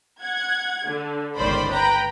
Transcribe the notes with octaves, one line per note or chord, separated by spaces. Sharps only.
F#5 G#6
D3
G1 C#2 D#3 C5 D5 B5
B4 G5 A#5 B5